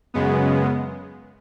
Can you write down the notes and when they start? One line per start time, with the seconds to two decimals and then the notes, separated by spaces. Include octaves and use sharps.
0.14 F#2 C#3 G#3 B3